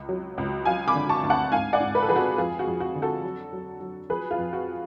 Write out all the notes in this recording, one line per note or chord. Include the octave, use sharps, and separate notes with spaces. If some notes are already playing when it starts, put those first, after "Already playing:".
Already playing: C#2
F#3
C#2
F#3 F5 G#5
B5 D6
D3
A5 C#6
D2
F#5 A5
G#2 F5 G#5
D5 F#5
G#2
B4
A4
F3 G#4 B4
F#4 A4
F2 F4 G#4
F#4
F2
F#4
D3
F#4 A4
F#3
F#3
F#3
F3 G#4 B4
F4 G#4
F2
F#4